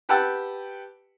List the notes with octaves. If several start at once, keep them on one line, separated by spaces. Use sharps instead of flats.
G4 B4 F#5 G5 A5 E6